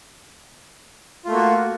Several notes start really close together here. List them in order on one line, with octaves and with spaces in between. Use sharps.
F4 A3 A#3 F#4